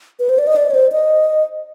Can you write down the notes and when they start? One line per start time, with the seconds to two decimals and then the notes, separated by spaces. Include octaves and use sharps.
0.19 B4
0.29 C5
0.38 D5
0.47 D#5
0.56 D5
0.70 C#5
0.74 C5
0.92 D#5